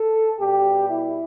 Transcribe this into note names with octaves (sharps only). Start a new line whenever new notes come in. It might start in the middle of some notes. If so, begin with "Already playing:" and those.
Already playing: A4
B2 G3 G4
E4